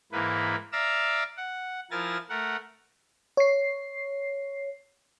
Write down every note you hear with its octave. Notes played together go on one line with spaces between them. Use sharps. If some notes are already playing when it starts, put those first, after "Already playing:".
G#2 E3 A#3 B4
D5 E5 F5 A#5 D6 E6
F#5
F3 E4 A#4 G#5 A6 A#6
A3 A#4 F#5
C#5 C7